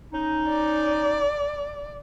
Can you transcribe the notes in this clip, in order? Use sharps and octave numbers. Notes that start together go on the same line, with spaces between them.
C#4 D#4
D5